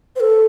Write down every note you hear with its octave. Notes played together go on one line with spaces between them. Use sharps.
C5
A4